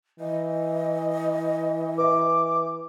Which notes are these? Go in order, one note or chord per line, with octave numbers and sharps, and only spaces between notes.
E3 D#5
B4 E5 D6